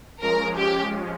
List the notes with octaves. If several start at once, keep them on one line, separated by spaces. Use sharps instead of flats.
F3 G#3 C#4 A#4
G4